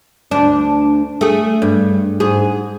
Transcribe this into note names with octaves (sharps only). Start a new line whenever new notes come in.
D2 D4
A3 G#4
G2
G#2 G#4